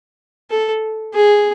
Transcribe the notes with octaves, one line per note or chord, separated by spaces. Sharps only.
A4
G#4